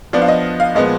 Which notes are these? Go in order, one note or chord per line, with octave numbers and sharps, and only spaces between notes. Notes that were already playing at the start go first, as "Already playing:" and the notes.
F3 B3 D4 D5
F5
D#5
F5
A#2 F3 G#3 B3 D#5